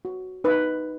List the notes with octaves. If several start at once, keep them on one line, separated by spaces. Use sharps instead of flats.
F#4
D#4 B4